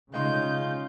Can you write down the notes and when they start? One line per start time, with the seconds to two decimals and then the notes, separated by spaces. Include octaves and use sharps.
0.14 C#3 G#3 D#4 F4 C6 G6